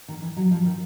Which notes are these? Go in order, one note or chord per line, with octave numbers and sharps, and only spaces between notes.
D#3
E3
F#3
F3
D#3